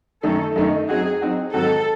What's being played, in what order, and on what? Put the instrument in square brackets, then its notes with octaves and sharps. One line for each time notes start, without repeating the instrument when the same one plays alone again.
[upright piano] F#2 D#3 A3 D#4 [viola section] A4
[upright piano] F#2 D#3 A3 D#4
[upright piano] F#3 C4 D#4 F#4 [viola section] G#4
[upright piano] F#3 C4 D#4 F#4
[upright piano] G#2 D#3 F#3 C4 F#4 [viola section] A4